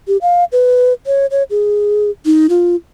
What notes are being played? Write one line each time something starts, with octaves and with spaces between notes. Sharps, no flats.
G4
F5
B4
C#5
C#5
G#4
D#4
F4